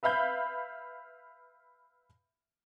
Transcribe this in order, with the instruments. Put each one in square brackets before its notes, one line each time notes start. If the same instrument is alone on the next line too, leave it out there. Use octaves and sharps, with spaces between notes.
[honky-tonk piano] B4 E5 F5 B5 G6